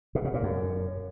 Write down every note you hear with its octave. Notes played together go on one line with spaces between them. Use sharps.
B2
C#3
A#2
F#2